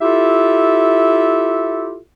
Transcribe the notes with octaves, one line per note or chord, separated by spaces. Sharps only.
E4 F4 G4 A4 E5